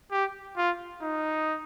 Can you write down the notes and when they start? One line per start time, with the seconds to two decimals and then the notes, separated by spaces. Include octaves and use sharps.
0.12 G4
0.57 F4
1.02 D#4